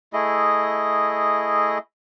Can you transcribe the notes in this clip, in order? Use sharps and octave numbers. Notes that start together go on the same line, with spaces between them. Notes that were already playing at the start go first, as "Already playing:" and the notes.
A3 E4 G#4 D#5